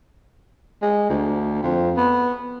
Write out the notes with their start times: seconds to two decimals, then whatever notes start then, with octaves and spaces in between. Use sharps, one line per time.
0.82 G#3
1.10 D2
1.63 F2
1.97 B3